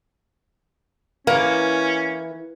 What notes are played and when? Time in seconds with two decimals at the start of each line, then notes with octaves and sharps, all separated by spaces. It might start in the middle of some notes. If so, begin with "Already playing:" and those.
1.27 E3 A#3 C#4